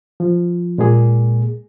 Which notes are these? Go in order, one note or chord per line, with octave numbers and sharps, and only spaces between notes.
F3
A#2 G#3 A#3 G#4